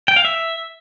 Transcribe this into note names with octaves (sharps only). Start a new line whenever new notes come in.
G5
F5
E5